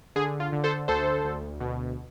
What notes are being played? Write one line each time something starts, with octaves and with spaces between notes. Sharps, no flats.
D3 G#4
F4
D3
A4 C5
D2 A4 C5
D2
B2